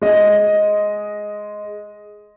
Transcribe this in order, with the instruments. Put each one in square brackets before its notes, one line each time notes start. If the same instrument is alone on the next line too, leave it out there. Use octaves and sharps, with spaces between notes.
[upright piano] G#3 D#5